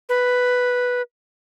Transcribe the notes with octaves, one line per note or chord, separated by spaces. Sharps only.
B4